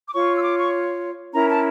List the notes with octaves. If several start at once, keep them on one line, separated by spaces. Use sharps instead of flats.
D6
F4 C#5 C#6
E6
D6
C#6
C#4 E4 A#4 A#5
A5